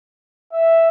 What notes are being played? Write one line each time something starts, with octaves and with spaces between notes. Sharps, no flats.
E5